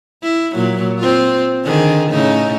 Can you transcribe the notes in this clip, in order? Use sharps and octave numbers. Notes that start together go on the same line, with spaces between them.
E4
A#2 F#3
C4 F4
D3 D#3 G#4
A2 C#3 D#4